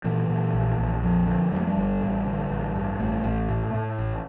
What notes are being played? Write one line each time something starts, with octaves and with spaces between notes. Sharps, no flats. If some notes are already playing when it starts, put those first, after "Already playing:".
A#2 E3
A#2
A#1
A#1
F2 F3
D3 F3
F2 G3
A3
G3
G1
A1
D3
A1
G2
A1 A3
A1
A2
A2
A1